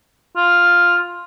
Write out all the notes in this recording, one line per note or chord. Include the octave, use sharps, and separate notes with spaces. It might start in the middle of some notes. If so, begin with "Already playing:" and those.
F4